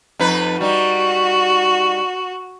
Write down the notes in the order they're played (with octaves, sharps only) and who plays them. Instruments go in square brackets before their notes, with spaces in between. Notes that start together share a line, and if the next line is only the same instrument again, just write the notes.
[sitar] F2 D#4 B4
[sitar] G3 D#4 [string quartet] F#4